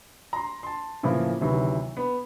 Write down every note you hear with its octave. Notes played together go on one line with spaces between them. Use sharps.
A#5 C6
A5 C6
A2 C#3 E3 F3 A#3
D2 C3 D#3 E3 F#3 B3
B3